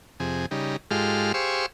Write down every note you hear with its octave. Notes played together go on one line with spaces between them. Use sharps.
F2 C3 G#4
C#3 G3 D#4
G#2 G#3 F4 G4 A4 F6
G4 G#4 C5 F5 C#6 E6